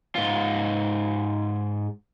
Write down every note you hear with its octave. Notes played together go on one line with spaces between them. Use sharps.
G#2 F4